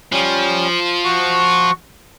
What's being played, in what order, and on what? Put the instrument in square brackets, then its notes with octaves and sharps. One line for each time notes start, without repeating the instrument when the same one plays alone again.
[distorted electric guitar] F3 [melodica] G3 C#4
[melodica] F#4 C#6